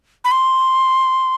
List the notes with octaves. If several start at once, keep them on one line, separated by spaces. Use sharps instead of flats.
B5
C6